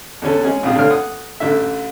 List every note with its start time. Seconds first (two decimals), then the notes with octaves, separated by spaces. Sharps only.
0.22 E2 D3 C#4 A4
0.43 G#3 C#4 G#4
0.63 A#1 C3 F5 D#6
0.75 D2 D3 C#5 F5 F6
0.90 F#5 D#6
1.40 A1 D3 E5